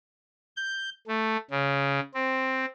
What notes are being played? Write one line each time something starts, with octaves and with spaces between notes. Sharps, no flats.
G6
A3
C#3
C4